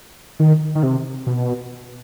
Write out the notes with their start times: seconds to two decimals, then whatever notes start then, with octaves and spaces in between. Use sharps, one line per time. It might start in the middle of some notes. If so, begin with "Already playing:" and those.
0.40 D#3
0.75 D#3
0.83 C3
1.27 B2